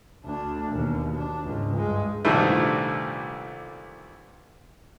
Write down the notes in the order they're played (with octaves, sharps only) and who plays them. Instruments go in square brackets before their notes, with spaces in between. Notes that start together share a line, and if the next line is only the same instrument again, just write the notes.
[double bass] D2 D4
D#2 B2
D4
C#2 G#2
G2 G#3
[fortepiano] C2 G2 A#2 D#3 G3 A3